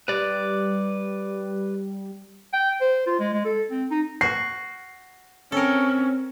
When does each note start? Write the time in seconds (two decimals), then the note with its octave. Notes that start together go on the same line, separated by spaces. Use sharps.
0.08 G3 B4 D5
2.53 G5
2.81 C5
3.07 F4
3.20 G#3
3.33 G#3
3.45 A4
3.71 C4
3.91 D#4
4.21 F#4 C7
5.52 C4 C#4 A4 A#4